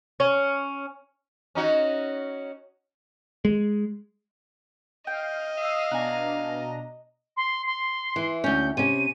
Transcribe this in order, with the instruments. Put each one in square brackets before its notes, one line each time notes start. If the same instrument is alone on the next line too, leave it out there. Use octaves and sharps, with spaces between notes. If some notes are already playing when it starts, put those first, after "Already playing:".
[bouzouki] C#4
[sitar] C#4 D#4 F#4
[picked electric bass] G#3
[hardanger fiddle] D#5 [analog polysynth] F5 [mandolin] G5
[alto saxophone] F5 [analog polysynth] D#6 E6 C7
[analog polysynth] B2 D4 A#5 [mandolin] F#4 G#5
[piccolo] C6
C6
[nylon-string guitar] E3
[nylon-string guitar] D2 C#4 [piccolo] G6
[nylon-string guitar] C3 C#4 [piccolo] D#7